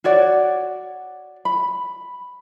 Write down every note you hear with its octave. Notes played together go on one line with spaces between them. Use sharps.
F#4 C#5 D5 F#5
B5